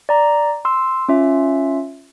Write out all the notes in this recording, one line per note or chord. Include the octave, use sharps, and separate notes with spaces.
D5 A#5
C6 E6
C#4 F4 E5